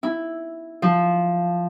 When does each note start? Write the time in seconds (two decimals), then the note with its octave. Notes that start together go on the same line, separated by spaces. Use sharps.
0.03 E4
0.82 F3